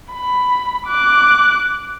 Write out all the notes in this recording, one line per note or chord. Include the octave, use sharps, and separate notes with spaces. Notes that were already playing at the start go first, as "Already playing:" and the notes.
B5
D6 F#6